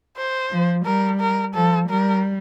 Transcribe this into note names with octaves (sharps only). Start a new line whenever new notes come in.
C5
F3
G3 A#4
A#4
F3 A4
G3 A#4